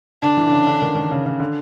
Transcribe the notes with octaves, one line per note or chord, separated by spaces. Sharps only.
D3 D4
E3
D3
C#3
D3
D#3
D#3
C#3
C#3
D3